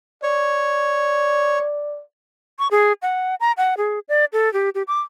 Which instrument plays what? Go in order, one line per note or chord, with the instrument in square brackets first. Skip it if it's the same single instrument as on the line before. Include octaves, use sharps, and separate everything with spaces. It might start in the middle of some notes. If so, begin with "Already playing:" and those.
[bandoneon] C#5 [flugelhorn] D5
[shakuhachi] C#6
G#4
F#5
A#5
F#5
G#4
D5
A4
G4
G4
D6